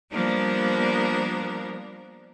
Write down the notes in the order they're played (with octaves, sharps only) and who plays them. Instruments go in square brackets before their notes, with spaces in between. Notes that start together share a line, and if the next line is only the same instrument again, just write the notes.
[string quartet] F3 G3 A#3 B3 D4 A#4